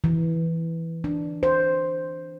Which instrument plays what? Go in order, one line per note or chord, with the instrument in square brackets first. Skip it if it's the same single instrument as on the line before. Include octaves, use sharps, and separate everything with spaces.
[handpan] E3
D4
C5